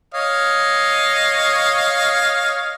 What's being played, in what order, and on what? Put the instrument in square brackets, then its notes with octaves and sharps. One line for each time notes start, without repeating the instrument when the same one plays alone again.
[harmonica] C#5 D#5 F5